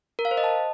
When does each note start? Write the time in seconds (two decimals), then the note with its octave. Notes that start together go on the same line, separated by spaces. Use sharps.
0.19 A#4
0.25 F5
0.31 C5
0.37 D#5
0.44 A5